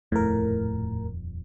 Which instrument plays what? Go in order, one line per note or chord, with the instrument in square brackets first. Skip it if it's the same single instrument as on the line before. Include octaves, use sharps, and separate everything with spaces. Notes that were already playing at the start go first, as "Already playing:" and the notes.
[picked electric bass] D#1 F2 [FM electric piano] A2 A#4